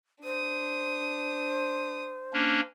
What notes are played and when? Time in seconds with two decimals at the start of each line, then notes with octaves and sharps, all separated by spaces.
0.23 D4 C5 D#6
2.33 A#3 C#4 D4